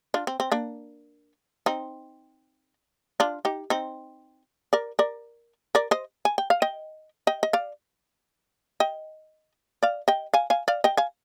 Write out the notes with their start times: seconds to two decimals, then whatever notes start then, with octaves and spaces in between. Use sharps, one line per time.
0.14 D4 F4
0.27 C4
0.40 C4
0.52 A#3 D4
1.66 C4 D#4
3.20 D4 F4
3.45 D#4 G4
3.70 C4 D#4
4.73 A#4 D5
4.99 A#4 D5
5.75 A#4 D5
5.91 C5 D#5
6.25 G#5
6.38 G5
6.50 F5
6.62 D#5 G5
7.27 D#5 G5
7.43 D#5
7.53 D5 F5
8.80 D#5 G5
9.83 D5 F5
10.08 D#5 G5
10.34 F5 G#5
10.50 F5 G#5
10.68 D5 F5
10.84 D#5 G5
10.97 F5 G#5